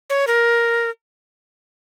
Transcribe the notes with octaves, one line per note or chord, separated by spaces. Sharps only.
C#5
A#4